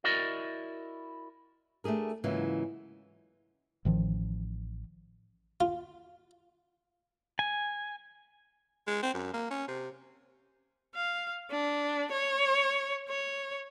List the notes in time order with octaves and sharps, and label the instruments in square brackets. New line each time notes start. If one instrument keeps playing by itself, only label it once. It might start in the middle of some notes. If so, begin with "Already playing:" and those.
[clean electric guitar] E4 F#4 A#4 D5 D#5
[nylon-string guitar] A3 D4 G4 G#4 A#4
G#2 C#3 E3 F#3 A#3 F4
[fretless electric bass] A1 D#3 F3
[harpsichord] F4
[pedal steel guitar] G#5
[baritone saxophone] G#3
C4
F#2
A#3
C#4
C3
[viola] F5
D4
C#5
C#5